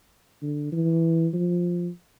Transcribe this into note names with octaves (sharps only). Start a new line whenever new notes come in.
D3
E3
F3